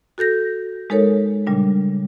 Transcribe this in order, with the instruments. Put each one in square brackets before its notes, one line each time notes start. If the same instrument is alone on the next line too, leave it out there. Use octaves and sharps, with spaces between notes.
[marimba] F#4 A4 G6 A#6
G#3 D#4 A4 A#4 C#5
A#2 C#3 G3 D4